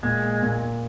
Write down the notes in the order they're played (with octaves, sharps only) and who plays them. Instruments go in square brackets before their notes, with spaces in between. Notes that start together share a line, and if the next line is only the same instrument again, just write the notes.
[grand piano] A#2 [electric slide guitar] G#3
[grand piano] A#2